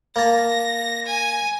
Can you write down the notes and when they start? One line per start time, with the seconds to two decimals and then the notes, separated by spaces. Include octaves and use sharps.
0.16 A#3 A5 A#6
1.06 G#5